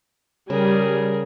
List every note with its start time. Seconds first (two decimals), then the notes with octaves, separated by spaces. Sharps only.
0.50 C#3 G3 G#4 A#4